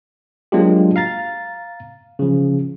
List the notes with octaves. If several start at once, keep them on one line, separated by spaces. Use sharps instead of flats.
F#3 G#3 A#3 D4 F4 G4
F5 A#5 A6
C#3 F3